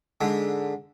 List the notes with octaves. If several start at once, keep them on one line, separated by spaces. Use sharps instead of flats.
G#2 D3